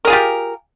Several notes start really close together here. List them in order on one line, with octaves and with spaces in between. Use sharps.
A#4 G#4 F4 G4